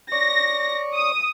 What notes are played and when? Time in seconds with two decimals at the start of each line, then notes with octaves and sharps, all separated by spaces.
0.12 C#5 D5 C#6 A#6
0.96 D#6